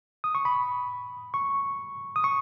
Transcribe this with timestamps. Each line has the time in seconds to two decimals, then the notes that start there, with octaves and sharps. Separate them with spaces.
0.24 D#6
0.35 C#6
0.45 B5
1.34 C#6
2.16 D#6
2.24 C#6